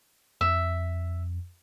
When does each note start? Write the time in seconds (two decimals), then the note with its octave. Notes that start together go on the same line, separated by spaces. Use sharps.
0.41 F2 E5